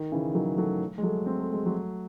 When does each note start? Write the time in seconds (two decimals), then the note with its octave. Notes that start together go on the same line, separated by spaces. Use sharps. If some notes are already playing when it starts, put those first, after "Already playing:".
Already playing: D#3
0.12 C#3 E3
0.34 D#3 F#3
0.57 F#3 A3
0.98 G#3
1.03 F#3 A3
1.26 C4
1.40 A3
1.53 G#3
1.66 F#3 A3